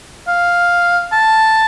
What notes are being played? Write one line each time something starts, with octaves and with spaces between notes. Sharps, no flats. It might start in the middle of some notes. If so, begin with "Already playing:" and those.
F5
A5